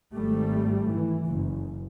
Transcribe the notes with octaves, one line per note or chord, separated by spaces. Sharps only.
G#1 G3 A3
E3
F#1